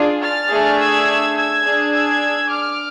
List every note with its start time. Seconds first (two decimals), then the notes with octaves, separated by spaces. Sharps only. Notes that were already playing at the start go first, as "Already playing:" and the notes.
Already playing: D4 F4 G#4
0.22 F6 A6
0.50 A3 D4 G#4
0.79 E6 G#6
1.36 E6 G#6
1.64 D4 G#4
1.92 E6 G#6
2.49 D6 F6